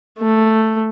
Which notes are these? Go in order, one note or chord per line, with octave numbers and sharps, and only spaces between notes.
A3